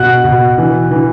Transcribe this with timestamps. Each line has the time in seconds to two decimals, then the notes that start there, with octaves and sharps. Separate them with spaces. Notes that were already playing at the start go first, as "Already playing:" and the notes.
Already playing: B2 F#5 F#6
0.24 B2
0.58 E3
0.91 E3